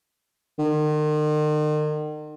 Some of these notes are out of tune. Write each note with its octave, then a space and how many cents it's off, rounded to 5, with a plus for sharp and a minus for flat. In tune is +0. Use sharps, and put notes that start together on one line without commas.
D#3 -40